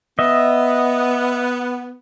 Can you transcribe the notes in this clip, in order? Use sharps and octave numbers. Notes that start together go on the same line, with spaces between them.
B3 D#5 E5